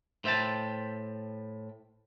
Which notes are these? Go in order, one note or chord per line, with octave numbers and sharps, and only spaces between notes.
A2 C5 E5 G5 A5